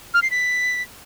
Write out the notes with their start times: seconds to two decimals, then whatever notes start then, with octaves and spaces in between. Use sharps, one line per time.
0.14 F6
0.22 C7
0.31 B6